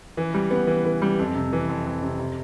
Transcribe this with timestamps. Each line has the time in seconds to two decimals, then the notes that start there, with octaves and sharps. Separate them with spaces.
0.17 E3
0.34 G3
0.51 B3
0.67 E3
0.85 E3
1.02 G3
1.19 F2
1.35 C3
1.53 E3
1.69 F2
1.86 F2
2.02 C3
2.19 C3